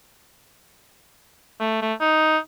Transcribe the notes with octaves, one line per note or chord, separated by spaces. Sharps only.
A3
A3
D#4